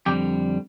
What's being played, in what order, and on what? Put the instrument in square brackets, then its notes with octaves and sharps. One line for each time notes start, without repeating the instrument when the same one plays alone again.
[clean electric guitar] F2 D3 G3 G4